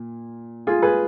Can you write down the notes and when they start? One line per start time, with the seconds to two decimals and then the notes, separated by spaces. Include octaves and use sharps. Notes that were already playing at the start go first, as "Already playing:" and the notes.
Already playing: A#2
0.67 F4 G#4
0.82 G#4 B4